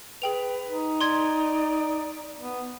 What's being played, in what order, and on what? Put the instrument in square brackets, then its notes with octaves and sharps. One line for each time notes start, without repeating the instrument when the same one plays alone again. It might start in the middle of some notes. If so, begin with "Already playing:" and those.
[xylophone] G#4 G5 F7 [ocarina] B4
[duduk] D#4
[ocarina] D5 [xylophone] C6 G#6
[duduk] B3